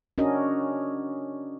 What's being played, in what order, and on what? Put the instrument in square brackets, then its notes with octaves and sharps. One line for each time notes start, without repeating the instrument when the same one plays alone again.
[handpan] C#4 D4 F#4 A#4 D#5